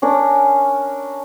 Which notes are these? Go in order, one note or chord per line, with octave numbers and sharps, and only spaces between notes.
C#4 D4 A#4